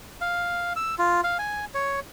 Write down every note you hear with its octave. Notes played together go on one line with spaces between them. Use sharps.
F5
E6
F4
F5
G#5
C#5